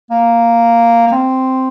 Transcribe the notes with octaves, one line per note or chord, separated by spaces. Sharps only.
A#3
A#3
C4